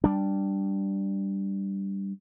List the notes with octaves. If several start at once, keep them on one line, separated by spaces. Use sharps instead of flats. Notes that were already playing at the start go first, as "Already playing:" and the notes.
G3 D4